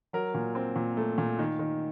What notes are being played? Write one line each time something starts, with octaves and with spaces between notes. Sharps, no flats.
F#3 A#4
A#2
C4
A#2
A3
A#2
D#3
D#3